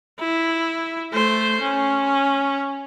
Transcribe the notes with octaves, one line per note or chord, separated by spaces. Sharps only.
E4
A3 C5
C#4